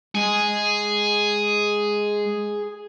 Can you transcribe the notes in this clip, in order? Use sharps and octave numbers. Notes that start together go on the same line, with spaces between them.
G#3 G#4